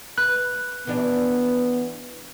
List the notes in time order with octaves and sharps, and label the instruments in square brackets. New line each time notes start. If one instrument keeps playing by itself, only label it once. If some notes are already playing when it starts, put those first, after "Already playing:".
[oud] B4 [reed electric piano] F#6
[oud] E3 D4 G4 [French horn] B3